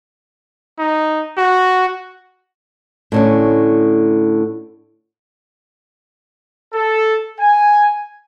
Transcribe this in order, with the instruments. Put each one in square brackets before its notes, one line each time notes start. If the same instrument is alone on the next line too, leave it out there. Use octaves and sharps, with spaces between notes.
[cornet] D#4
F#4
[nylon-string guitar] A2 D3 C#4
[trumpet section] A4
G#5